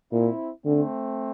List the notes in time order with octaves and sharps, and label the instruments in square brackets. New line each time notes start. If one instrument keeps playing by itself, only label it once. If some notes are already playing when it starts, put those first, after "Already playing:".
[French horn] A#2 [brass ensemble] C4 E4
[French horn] D3 [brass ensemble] A3 C4